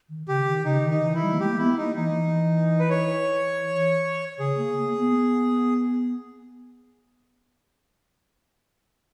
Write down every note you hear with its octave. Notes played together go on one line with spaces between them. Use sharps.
D#3
C#3 G4
D#3
C#3 D#4
D#3
D#4
E3
E4
G3
A#3
G#3 G4
A#3
B3 E4
A#3 D#4
E3 D#4
E3
B4
C#5
C#3 G#4
A#3
A#3
B3